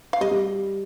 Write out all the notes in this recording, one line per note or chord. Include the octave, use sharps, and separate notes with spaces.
F5
G3 D#5
G3